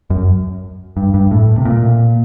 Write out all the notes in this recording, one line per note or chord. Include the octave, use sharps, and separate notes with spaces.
F#2
G2
G2
A2
C3
A#2